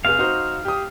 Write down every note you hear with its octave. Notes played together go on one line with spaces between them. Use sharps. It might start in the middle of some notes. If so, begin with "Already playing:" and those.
F1 G#4 F5
D#4 F#4 C5
G4 D#6